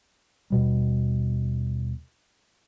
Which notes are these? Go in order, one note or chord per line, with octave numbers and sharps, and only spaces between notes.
D#2 B2 G3